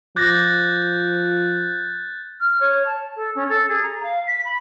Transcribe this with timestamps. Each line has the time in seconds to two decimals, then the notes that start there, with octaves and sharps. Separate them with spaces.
0.16 F3 D6 F#6 G6 A6 A#6
2.40 F6
2.60 C#5
2.86 A5
3.16 A4
3.35 C#4
3.49 A4
3.69 G#4
3.83 A#5
4.03 F5
4.27 B6
4.45 B5